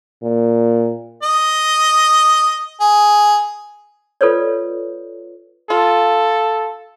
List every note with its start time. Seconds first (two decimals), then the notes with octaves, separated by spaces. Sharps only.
0.23 A#2
1.23 D#5
2.80 G#4
4.21 F4 A4 B4 C#5 D5
5.70 F4 A4